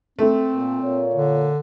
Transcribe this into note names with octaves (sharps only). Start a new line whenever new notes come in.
A3 C4
A#2
A#2 F4 C#5
D3